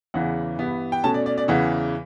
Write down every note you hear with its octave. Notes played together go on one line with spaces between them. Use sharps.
E2 C#3 E3 F#5
G2 E3 B3
G5
B2 A3 C#4 A5
D5
D5
D5
E2 C#3 E3 F#5